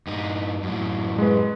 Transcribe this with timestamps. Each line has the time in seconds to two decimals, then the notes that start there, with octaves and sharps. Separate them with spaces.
0.07 G2 D#4
0.63 F#2 A2
1.19 G#3 B4